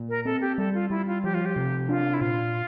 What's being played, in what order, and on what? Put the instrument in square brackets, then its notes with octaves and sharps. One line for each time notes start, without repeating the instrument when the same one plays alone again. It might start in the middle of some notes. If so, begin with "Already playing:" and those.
Already playing: [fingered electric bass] A#2
[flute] A#4
[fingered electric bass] C4 [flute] A4
[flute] G4
[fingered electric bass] G3 [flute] A4
[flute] F4
[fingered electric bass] G3 [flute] E4
[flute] F4
[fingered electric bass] F3 [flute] G4
[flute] F4
G4
[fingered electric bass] C3
[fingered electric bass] D4 [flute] F4
[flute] E4
[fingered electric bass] A#2 [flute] F4